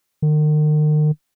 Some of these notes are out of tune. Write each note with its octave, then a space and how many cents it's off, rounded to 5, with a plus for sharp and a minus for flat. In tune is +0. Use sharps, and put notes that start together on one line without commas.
D#3 -40